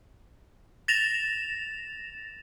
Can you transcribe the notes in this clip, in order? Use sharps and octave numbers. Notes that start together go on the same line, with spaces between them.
A6 A#6 E7 F7